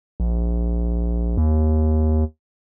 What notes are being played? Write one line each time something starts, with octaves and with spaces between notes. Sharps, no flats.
A#1
D#2